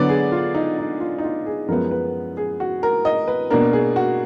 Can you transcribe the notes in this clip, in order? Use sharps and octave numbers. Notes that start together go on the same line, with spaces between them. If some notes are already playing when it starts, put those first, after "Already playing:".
Already playing: D3 F#3 B3 D4 D5
G#4
F4
D#4
D#4
F4
D#4
F4
G#4
F#2 F3 G#3 B3 A#4
B4
G#4
F#4
A#4
D#5
B4
B2 A#3 D4 A#4
G#4
F#4